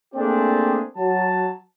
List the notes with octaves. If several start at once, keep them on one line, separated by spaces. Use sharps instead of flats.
A3 A#3 C4 D4 G4 G#4
F#3 A5